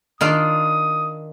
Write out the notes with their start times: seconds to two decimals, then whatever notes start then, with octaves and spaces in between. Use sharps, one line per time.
0.21 D#3 D4 F4 D#6